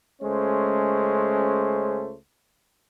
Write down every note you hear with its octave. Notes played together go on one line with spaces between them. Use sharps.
C#2 G#3 A3 C#4 C5